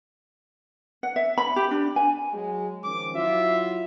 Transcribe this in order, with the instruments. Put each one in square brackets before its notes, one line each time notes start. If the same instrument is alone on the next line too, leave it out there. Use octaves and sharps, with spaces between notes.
[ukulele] F#5
E5
B5
G4
D4
G#5
[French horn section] F#3 G#3
[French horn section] D#3 F3 C#4 [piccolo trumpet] D6
[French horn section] F#3 E4 F4 [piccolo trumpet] E5